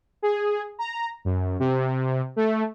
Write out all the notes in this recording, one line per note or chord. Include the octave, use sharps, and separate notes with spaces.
G#4
A#5
F#2
C3
A3